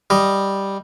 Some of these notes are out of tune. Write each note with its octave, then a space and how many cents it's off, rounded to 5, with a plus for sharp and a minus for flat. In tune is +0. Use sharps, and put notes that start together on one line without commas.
G3 +0 D#5 +0